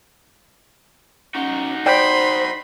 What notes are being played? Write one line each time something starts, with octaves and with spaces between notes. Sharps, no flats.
C#4 D#4 F#4
C5 D5 G5 B5 C6